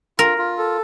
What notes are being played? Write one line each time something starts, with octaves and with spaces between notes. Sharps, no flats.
F4 A#4
F4
A4